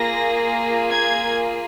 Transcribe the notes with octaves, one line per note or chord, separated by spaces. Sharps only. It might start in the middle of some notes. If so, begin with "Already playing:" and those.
Already playing: A#3 F4 G#4 A#6
G#6